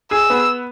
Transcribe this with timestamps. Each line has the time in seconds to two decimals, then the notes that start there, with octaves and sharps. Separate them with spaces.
0.11 G#4 E6
0.30 B3